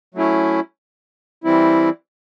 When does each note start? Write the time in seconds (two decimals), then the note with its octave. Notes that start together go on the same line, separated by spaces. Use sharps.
0.15 F#3 A3 C#4 E4
1.44 E3 G3 C4 E4